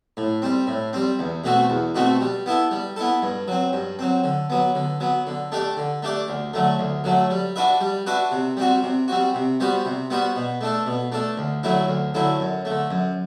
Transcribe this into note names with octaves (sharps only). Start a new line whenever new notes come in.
A2
G3 C4
A2
G3 C4
E2
B2 A3 C4 F#4
E2
B2 A3 C4 F#4
G3
B3 E4 A4
G3
B3 E4 A4
G2
F#3 C4
G2
F#3 C4
D3
F#3 B3
D3
F#3 B3
D3
A3 D4 G4 D5
D3
A3 D4 G4 D5
D2
D3 F#3 A3
D2
D3 F#3 A3
G3
D4 F#4 B4 E5
G3
D4 F#4 B4 E5
C3
G3 C4 F#4
C3
G3 C4 F#4
C3
G3 B3 F#4 C5
C3
G3 B3 F#4 C5
B2
A3 D4 A4
B2
A3 D4 A4
D2
D3 F#3 A3 E4
D2
D3 F#3 A3 E4
F#2
A3
D3
F#2